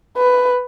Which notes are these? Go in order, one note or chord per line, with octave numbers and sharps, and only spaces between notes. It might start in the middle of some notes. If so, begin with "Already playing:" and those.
B4